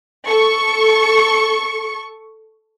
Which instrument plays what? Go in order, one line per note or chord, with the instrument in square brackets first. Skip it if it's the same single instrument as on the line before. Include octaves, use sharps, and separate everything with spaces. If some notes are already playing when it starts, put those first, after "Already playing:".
[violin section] A4 C#6